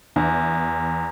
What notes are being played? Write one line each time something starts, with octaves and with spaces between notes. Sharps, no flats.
E2